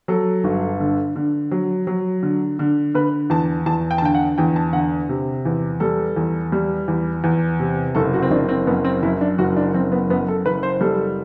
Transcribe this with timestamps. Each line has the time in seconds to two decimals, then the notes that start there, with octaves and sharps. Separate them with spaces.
0.08 F#3 A4
0.44 G1
0.80 D3
1.16 D3
1.51 F#3
1.87 F#3
2.23 D3
2.59 D3
2.95 D3 B4
3.30 E2 A5
3.66 E2 A5
3.91 G5
3.98 A5
4.02 D3 G5
4.15 F#5
4.38 E2 G5
4.56 A5
4.73 D3 F#5
5.09 C3
5.45 E2
5.80 G3 A4
6.16 E2
6.52 G3
6.88 E2
7.24 E2
7.60 C3
7.95 F#1 A4
8.14 F#4
8.22 C4
8.31 F#1 D4
8.49 C4
8.67 F#2 B3
8.85 C4
9.03 F#2 E4
9.21 D4
9.39 F#1 F#4
9.57 D4
9.74 F#2 C4
9.92 B3
10.10 F#2 B3
10.28 A4
10.46 F#1 B4
10.63 C5
10.81 G3 A4